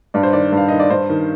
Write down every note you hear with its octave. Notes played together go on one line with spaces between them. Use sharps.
G2 D5
C5
D#3 D5
G2
F5
D#3 D#5
D5
G2 C5
D#3